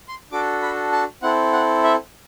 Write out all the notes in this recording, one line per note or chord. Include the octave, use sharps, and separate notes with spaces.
C6
D4 F#4 A4 D6
B5
A5
C4 E4 A4 F#5
F#5
E5